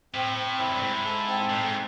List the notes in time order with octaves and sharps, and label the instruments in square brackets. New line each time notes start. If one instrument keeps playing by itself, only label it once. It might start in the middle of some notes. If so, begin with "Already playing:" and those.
[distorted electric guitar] A2 [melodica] C4
[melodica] C4
[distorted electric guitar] F#2 [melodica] E4
[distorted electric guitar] G2
[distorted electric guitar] G#2 [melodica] E4
[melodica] A4
C4
[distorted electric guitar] A2 [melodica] D#4
[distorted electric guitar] G#2